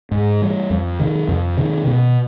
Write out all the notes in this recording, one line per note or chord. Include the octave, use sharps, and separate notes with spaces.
G#2
E3 G3
F2
C3 D#3
F2
C3 D#3
B2